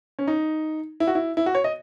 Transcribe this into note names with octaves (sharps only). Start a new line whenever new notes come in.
C#4
D#4
E4
F#4
E4
E4
F#4
C#5
D#5